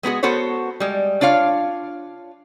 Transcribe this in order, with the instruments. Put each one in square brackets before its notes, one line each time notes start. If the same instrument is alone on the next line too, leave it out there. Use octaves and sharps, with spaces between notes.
[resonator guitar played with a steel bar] G#3 B3 F#4 G#4
B3 F#4 A4 C5 C#5
G3 G#3
D4 F4 C#5 F5